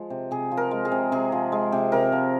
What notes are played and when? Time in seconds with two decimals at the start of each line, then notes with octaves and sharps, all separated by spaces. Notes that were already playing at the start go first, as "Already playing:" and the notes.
Already playing: F3 G#3
0.10 C3
0.31 C3 G#4
0.51 F3
0.57 A#4
0.71 G#3
0.85 G#4
0.92 C3
1.12 C3 G#4
1.32 F3
1.52 G#3
1.72 C3
1.92 C3 A#4
2.12 F3